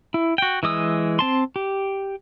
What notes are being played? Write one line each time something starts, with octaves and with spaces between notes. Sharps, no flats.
E4
F#4 G5
E3 G#3 D#6 E6
C4 A5 C6
G4